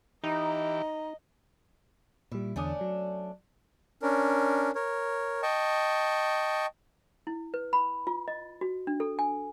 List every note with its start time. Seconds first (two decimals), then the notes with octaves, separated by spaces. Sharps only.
0.24 E3 D#4 G4 D#5 A#5
2.32 A#2 G3 E4
2.56 E2 D3 A3 C#4 D4 D#6
2.81 F#3
4.02 C#4 D4 A#4
4.75 A#4 C#5
5.43 D#5 G5 A5 C#6
7.27 E4
7.54 B4
7.73 B5
8.07 F4
8.28 D#5
8.61 F#4
8.87 D4
9.00 A4
9.19 G#5